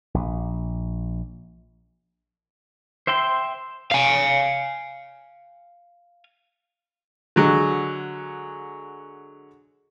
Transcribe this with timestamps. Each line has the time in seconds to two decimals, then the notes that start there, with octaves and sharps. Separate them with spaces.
0.14 A#1
3.07 C5 E5 G5 C6
3.91 F5 G#5
7.36 D3 F#3 G#3